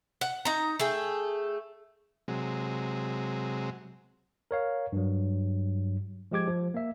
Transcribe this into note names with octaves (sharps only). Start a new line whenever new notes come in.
F#5
D#4 A#5
A3 G#4 G5
C3 F#3 G#3
A#4 C#5 F5
G2 F#3
F3 G#3 G4 D6 G#6
F3
A#3 E5